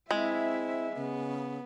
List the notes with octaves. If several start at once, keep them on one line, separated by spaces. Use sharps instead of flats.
G#3 C4 E4 E5
C#3 B3